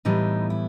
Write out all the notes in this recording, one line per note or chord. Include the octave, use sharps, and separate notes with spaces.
A2 E3 G3 B3 D#4
E4